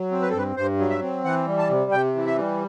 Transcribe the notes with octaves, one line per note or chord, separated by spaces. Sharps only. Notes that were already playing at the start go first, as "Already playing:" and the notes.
Already playing: F#3
C4
B4
A4
G2 B4
G2 C5
F#3
E5
C4
E3 F#5
G3
A5
C3
C3 G5
E3
E5
G3